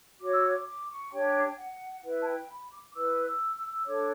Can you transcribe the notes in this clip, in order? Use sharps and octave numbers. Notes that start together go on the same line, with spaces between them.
F#4 C#5 D6
E6
D6
D6
C#6
D4 G4 C#5 G5
F#5
E4 B4
A5
G5
B5
D6
E4 B4 E6
E6
E6
E6
D4 A4 C#5 D6